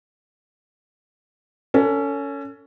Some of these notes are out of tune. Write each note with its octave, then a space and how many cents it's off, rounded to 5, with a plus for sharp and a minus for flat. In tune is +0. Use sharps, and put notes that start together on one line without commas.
C#4 +20 A4 +35